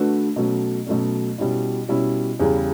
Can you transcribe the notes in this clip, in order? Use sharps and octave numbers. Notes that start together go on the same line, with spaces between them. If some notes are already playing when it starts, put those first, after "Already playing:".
Already playing: D3 A3 D4 F#4 B4
B2 F#3 A3 C#4
B2 F#3 A3 C#4
B2 G3 C#4 E4
B2 G3 C#4 E4
E2 C#3 E3 G3